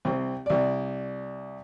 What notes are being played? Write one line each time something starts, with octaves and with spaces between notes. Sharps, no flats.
C2 C4
C2 D5